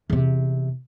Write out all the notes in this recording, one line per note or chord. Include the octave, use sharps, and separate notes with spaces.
E2 C3